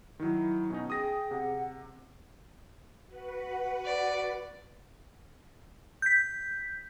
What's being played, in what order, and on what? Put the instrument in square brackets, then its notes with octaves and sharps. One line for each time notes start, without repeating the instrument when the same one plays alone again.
[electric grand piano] D#3 F#3 [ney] E4
[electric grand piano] B2 C#4 D#4
[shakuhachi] G#4 [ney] G5 [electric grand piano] D#6 A#6
[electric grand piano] C3 [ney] F#5
[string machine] F#4 B4 F#5
[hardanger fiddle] D5
[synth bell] G6 B6